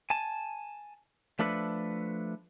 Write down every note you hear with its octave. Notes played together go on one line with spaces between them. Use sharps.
G#5 A5
F3 A3 D4 A4 B4